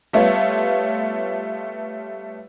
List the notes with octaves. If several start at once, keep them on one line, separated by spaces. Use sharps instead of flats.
G3 A3 B3 F4 C#5